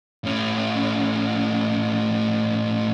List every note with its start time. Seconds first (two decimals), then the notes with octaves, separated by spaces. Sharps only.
0.25 A2 C#4